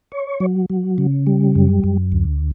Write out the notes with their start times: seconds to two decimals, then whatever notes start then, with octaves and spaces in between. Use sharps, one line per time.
0.12 C#5
0.40 F#3
0.70 F#3
0.98 C#3
1.27 G3
1.55 F#2
1.84 F#2
2.12 D2